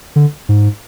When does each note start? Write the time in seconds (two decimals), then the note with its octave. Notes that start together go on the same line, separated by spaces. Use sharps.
0.16 D3
0.49 G#2